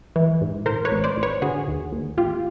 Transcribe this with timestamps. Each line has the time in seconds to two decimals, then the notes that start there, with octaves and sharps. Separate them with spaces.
0.16 E3
0.41 G#2
0.66 A2 A#4 C5
0.85 B4 C#5
0.91 A1
1.04 C5 D5
1.17 A1
1.23 B4 C#5
1.42 D3 F#4 G#4
1.68 D#2
1.92 D#2
2.17 A1 F4 G4